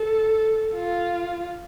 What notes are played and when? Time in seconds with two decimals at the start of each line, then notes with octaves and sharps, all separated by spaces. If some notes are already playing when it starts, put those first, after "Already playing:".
Already playing: A4
0.75 F4